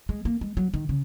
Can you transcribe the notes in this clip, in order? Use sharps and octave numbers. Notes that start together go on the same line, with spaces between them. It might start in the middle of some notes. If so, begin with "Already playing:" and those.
G#3
A#3
G#3
F#3
D#3
C#3